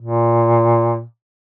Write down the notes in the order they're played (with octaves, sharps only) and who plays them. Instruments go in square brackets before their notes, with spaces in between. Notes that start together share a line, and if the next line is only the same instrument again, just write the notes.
[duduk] A#2